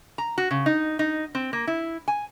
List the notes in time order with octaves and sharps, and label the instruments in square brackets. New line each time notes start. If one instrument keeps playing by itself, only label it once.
[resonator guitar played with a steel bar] A#5
F#4
C#3
D#4
D#4
C4
A#3
E4
G#5